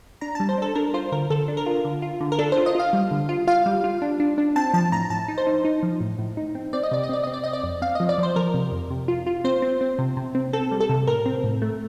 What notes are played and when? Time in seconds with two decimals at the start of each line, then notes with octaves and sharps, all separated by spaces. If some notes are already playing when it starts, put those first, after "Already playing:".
0.21 D4 A#5
0.35 G3 A5
0.49 C5
0.58 D4 A4
0.75 D4 A#4
0.94 F4 C5
1.12 D3 A#4
1.30 D3 A4
1.48 D4
1.57 A#4
1.66 F4
1.85 D3
2.02 F4
2.21 D3
2.32 A#4
2.39 D4 A4
2.52 F4 C5
2.66 D#5
2.75 F4 F5
2.93 G3
3.11 D3
3.29 F4
3.47 F4 F5
3.66 G3
3.84 F4
4.02 D4
4.20 D4
4.38 D4
4.56 C4 A5
4.74 F3 A5
4.92 A2 A#5
5.10 A2 A5
5.28 D#4
5.38 C5
5.47 D#4
5.65 D#4
5.83 F3
6.00 A2
6.19 A2
6.37 D#4
6.55 C4
6.73 C4 D5
6.83 D#5
6.91 C3 D5
7.03 D#5
7.09 C4 D5
7.23 C4 D#5
7.34 D5
7.44 C4 D#5
7.53 D5
7.64 F2
7.82 C4 F5
7.95 F3 D#5
8.09 D5
8.18 F3 C5
8.36 F3 A#4
8.54 C3
8.72 F2
8.91 C3
9.08 F4
9.26 F4
9.44 C4 C5
9.62 C4
9.81 C4
9.99 C3
10.17 C3
10.35 C4
10.53 C4 A4
10.71 G3
10.80 A4
10.89 C3
11.07 A2 A#4
11.26 C4
11.44 A2
11.62 A3